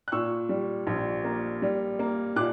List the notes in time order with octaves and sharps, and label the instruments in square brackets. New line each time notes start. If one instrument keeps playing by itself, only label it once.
[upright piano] F#6
A#2 C#6 E6
G3
A#1
A#3
G3
A#3
A#2 D6 F#6